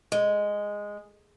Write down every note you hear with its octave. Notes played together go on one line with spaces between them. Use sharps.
G#3